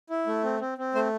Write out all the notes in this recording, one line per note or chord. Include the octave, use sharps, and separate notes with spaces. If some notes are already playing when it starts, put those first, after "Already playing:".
E4
A3
C4
C4
C4
A3 C5